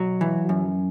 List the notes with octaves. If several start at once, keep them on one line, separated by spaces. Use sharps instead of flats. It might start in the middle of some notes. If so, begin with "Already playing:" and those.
Already playing: B2 F#3 F#4
E3
F#2